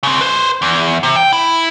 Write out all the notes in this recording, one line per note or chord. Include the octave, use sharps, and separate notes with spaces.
C#3 C4
B4 C5
E2
C3
G5
E4